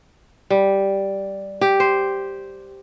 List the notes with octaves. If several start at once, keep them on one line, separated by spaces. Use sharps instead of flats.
G3
G4
C5